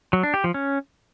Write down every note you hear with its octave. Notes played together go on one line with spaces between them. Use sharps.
F#3
D4
G4
F3
C#4